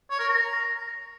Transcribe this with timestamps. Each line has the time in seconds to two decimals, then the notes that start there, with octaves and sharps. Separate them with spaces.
0.10 C#5
0.19 A#4
0.28 A#5